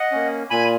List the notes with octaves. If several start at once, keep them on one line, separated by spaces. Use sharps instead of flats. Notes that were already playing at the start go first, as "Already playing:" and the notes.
Already playing: D#5 F#5
A#3 C#4
A#2 G#5 B5